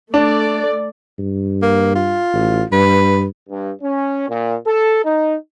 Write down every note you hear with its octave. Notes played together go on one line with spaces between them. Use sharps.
A3 D4 D5
G2
A#3
F4
A1
G2 B4
G2
C#4
A#2
A4
D#4